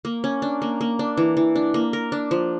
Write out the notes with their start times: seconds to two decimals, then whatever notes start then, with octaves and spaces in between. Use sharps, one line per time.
0.05 A#3
0.24 C#4
0.42 D4
0.62 A#3
0.81 A#3
0.99 D4
1.17 E3
1.37 E3
1.55 D4
1.74 A#3
1.93 A#4
2.12 D4
2.31 F3